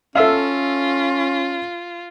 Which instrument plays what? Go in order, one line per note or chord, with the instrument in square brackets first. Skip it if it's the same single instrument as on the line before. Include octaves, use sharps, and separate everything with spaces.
[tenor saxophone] C#4 [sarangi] F4 [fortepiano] A4 E5 F5